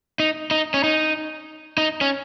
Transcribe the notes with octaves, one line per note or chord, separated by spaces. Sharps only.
D#4
D#4
C#4
D#4
D#4
C#4